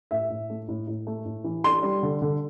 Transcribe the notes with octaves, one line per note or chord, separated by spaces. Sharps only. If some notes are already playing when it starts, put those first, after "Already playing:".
A2 E5
A2
A3
A2
A2
A3
A2
E3
D4 C6
G3
D3
D3